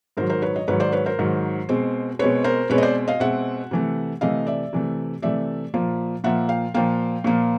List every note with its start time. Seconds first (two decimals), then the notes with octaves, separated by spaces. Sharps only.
0.17 G#2 D#3 F#3 A#4 C5
0.29 A#4 C5
0.42 B4 C#5
0.56 C#5 D#5
0.68 G#2 D#3 F#3 B4 C#5
0.80 C5 D5
0.93 B4 C#5
1.06 A#4 C5
1.19 G#2 D#3 F#3
1.69 B2 G#3 C4
2.19 B2 G#3 C4 B4 C#5
2.44 A#4 C5
2.70 B2 G#3 C4 B4 C#5
2.78 D#5
2.83 C5 D5
3.08 D#5 F5
3.20 B2 G#3 C4 E5 F#5
3.71 C3 E3 A3
4.21 C3 E3 A3 D#5 F5
4.46 D5 E5
4.73 C3 E3 A3
5.22 C3 E3 A3 D5 E5
5.74 A#2 F3 A#3
6.24 A#2 F3 A#3 E5 F#5
6.49 F5 G5
6.74 A#2 F3 A#3 F5 G5
7.24 A#2 F3 A#3